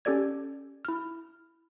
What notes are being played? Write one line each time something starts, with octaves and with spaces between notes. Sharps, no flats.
C#4 G4 A4 D5 G#6
E4 F6